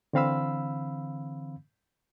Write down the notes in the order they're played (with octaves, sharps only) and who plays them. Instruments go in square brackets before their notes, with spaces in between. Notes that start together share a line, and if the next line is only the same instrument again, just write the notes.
[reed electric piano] D3 E3 C4 F5 B5 E6